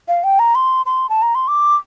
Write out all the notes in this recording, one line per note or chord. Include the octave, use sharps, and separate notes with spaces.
F5
G5
A#5
C6
C6
A5
A#5
C6
D6